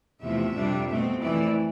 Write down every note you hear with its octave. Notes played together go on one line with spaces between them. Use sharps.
E2 C3 F3 A3 E5
F2 C3 G3 D4
B2 A3 C4
F2 E3 A3 D5